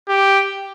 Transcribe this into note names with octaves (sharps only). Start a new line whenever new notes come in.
G4